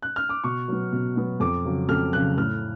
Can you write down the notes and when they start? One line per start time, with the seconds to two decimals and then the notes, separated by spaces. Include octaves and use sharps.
0.02 F#6
0.16 F6
0.29 D6
0.44 B2 C#6
0.68 F#3 B3
0.92 B2
1.16 F#3 B3
1.40 F2 D6
1.65 C#3 F#3
1.89 F2 F6
2.13 C#3 F#3 F#6
2.37 A2 F6